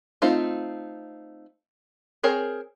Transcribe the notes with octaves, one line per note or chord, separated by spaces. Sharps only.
A3 C4 D#4 F4
C4 G#4 A#4 C#5